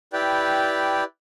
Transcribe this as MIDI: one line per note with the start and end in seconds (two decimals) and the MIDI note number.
0.13 1.04 64
0.13 1.04 67
0.13 1.04 71
0.13 1.04 74
0.13 1.04 79